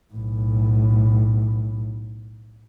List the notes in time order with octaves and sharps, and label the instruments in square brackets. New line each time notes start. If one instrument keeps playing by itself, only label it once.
[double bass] B1 A2